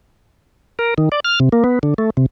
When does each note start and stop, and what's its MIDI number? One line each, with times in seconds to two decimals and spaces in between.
0.79 0.94 70
0.98 1.09 51
1.12 1.20 74
1.25 1.39 89
1.40 1.49 48
1.52 1.64 58
1.64 1.79 59
1.83 1.94 50
1.98 2.10 57
2.17 2.26 48